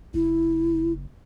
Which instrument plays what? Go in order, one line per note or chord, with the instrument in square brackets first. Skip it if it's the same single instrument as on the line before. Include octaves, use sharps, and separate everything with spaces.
[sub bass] F#1 [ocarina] E4